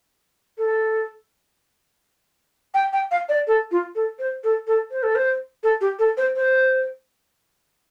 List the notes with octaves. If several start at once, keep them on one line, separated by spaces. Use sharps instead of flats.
A4
G5
G5
F5
D5
A4
F4
A4
C5
A4
A4
C5
A4
C5
A4
G4
A4
C5
C5